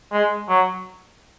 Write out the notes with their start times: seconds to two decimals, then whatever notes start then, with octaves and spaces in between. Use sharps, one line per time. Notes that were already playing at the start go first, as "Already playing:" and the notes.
0.12 G#3
0.49 F#3